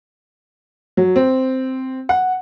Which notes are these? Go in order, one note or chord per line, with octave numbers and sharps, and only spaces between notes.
F#3
C4
F#5